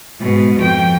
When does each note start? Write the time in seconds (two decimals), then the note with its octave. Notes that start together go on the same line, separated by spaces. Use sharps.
0.20 G#2 B2
0.59 F2 G5